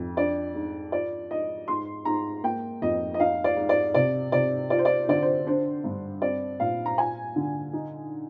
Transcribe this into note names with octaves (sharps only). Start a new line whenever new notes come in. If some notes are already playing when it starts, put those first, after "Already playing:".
Already playing: F2
D4 D5
G#2
F4 D5
G#2 D#5
G#2 C6
G#2 A#5
A#3 G5
F2 D#5
D#5
D#4 F5
D5
G#2
D5
C3 D5
C3 D5
F4 D5
C5
D5
D3 D5
C5
D4 C5
G2
C4 D5
A#2 F5
A#5
F4 G#5
D3
D#4